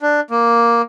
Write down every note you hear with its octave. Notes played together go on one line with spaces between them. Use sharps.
D4
A#3